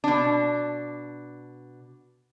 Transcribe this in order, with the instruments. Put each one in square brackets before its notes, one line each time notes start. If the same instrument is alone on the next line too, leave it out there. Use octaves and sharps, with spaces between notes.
[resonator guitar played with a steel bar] B2 D4